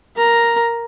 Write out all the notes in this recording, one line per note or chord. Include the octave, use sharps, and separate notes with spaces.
A#4 A#5